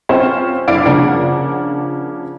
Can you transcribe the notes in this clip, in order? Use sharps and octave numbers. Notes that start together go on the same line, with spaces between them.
C4 C#4 F4 C5
F#1 D4 E4 D5 F5 D7
C#3 F3 A#3 D4 F#5